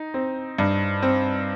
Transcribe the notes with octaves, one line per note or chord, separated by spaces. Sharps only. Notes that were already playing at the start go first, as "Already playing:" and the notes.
Already playing: D#4
C4
G2
C4